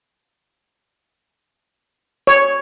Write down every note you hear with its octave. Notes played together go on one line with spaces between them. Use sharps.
C#5